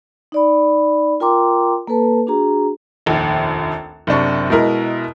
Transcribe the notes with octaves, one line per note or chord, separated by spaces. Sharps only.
D#4 D5 B5
F4 A#4 G5 A#5 C6 D6
A#3 A4 B4 A5
D4 F#4 G#4 A#5
F1 A#1 D#2
F#1 C3 D4 C#6
B2 G#3 E4 A#4